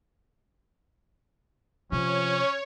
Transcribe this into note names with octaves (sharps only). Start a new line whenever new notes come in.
C3 F3 C#4 C#5